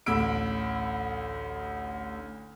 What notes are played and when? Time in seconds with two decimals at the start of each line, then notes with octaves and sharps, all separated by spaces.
0.06 A1 D2 B5 E6 D7